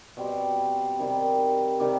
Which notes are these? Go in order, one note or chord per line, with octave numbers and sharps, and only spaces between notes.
B2 G3 C4
C3 D#3 G3
C3 D#3 G3 G4